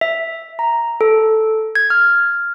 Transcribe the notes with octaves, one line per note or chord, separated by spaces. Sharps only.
E5
A#5
A4
G#6
F6